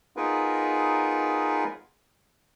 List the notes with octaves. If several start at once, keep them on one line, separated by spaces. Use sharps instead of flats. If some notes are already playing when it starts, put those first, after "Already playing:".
B3 D#4 F4 G#4 A#4 B4